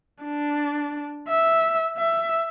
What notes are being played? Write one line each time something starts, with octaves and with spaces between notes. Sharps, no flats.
D4
E5
E5